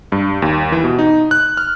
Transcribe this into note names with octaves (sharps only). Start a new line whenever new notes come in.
G2
D#2
E3
B2
D#4
F#6
F6